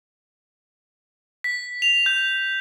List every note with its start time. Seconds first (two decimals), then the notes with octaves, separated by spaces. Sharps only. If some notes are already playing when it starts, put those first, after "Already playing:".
1.44 B6
1.82 F7
2.06 G6